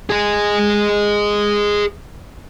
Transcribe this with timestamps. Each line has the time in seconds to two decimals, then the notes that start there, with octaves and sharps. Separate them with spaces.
0.10 G#4 D#5